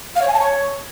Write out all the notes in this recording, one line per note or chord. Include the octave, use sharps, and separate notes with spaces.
F5
C#5
G#5
A5
C#5